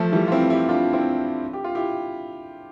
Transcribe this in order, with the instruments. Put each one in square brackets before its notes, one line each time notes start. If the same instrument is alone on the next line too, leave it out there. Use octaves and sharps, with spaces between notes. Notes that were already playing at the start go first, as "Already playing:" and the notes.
Already playing: [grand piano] F3 A3
E3 G3
F4
C4 E4
E4 G4
D4 F4
C4 E4
G4
F4
E4 G4